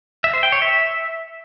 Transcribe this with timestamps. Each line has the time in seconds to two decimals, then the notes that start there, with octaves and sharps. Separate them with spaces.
0.24 E5
0.34 C5
0.43 G5
0.52 C#5
0.62 E5